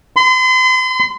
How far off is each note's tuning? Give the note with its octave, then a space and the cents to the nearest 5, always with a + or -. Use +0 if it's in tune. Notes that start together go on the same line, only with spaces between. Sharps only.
C6 -40